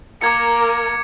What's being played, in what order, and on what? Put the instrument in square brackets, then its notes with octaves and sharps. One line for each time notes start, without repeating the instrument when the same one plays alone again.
[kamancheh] A#3 A#4 [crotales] D6 G#6 C#7